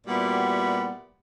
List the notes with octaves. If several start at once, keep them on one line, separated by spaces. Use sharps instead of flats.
A#2 G3 B3 E4 F#4 G4